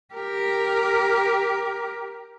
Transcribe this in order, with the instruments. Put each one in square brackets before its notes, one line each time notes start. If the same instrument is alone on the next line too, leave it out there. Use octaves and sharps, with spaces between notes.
[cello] G4 A#4